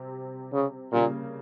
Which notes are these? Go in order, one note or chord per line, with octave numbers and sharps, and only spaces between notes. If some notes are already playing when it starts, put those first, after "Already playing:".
Already playing: C3 G3 C4 G4
C#3
A#2 C#3 G3 A#3